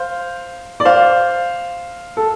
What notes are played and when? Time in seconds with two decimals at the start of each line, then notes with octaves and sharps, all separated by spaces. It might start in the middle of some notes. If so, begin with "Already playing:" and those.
Already playing: C5 F5
0.80 D5
0.85 C5 F5
2.17 A4